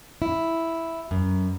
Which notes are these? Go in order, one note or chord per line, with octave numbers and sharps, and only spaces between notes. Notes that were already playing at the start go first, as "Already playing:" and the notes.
E4
F#2